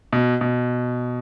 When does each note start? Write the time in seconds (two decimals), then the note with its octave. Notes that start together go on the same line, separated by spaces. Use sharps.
0.13 B2
0.41 B2